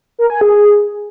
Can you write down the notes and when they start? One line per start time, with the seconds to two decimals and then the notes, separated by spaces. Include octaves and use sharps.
0.19 A#4
0.30 G#5
0.41 G#4